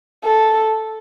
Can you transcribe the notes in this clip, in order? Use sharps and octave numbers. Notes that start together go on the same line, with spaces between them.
A4